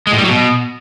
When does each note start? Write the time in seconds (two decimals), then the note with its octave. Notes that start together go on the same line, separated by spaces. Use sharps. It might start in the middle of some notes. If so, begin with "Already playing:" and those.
0.07 G#3
0.12 A2
0.18 G3
0.24 F#3
0.29 B2